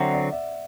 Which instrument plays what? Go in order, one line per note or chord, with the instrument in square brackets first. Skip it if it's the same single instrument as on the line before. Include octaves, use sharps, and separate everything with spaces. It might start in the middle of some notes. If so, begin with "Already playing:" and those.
Already playing: [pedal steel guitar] D3 F#3 C4 [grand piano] E5 F#5
[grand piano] D5
E5